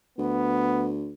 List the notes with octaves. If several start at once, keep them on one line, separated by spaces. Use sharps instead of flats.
D2 B3